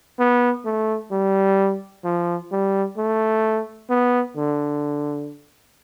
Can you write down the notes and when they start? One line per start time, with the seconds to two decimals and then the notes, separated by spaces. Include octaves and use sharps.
0.19 B3
0.65 A3
1.12 G3
2.04 F3
2.51 G3
2.97 A3
3.90 B3
4.36 D3